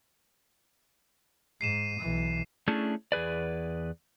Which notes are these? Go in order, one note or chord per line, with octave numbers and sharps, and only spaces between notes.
G#2 C7 D#7 E7
B1 E3
A3 C#4 D4 E4 G#4
E2 G#4 B4 D5